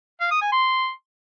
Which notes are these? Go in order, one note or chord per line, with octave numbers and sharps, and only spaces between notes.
F5
D#6
G#5
C6